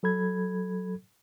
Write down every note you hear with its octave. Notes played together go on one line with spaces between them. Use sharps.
F#3 A4 B5 G#6